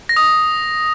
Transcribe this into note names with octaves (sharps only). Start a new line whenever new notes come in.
A#6
D#6
A#6